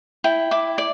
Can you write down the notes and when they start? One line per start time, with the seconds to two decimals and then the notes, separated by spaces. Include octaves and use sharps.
0.24 E4 G5
0.51 E4 D6
0.78 D5